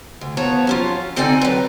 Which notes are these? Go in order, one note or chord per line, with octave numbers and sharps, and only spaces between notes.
D2
F3 B3 C#5 A5 A#5
F#3 C#4 F4
D3 C4 D#4 A4 D5 G#5
F#3 B4